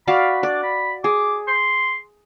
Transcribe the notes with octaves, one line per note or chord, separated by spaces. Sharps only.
F#4 D5 F5 B5
D4 D5
B5
G#4 D6
C6